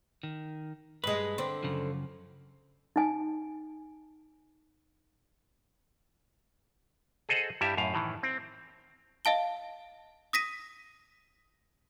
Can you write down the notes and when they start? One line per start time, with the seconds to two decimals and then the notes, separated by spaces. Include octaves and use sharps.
0.23 D#3
1.04 G2 G#3 B4
1.38 D3 C4 D4
1.63 F#2 C#3 F3
2.96 D#4 G#5
7.29 G#4 A4 C5 D#5 F#5
7.61 G2 G3 E4 G4 E5
7.77 F#2 A2 F5
7.94 A2 D#3 E3
8.23 C4
9.25 D#5 F5 A5 G7
10.33 D#6 A#6 B6 D#7